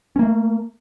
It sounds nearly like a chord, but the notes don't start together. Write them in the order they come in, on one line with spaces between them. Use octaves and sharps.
C#4 A#3 A3